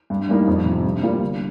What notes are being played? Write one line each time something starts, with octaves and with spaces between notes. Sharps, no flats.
G2
G3 A#3 D#4
F2
C3 F3
G2
G3 A#3 F4
G1